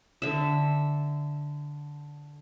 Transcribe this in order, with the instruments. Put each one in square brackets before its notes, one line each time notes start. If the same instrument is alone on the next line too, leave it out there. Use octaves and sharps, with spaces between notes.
[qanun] D3 E5